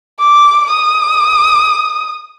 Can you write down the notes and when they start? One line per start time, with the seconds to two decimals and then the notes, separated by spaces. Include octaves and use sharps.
0.20 D6
0.70 D#6